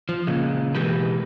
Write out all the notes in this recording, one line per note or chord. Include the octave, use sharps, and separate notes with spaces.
F3
A#2 C#3 G#3
B2 E3 G#3 G4 A#4 B4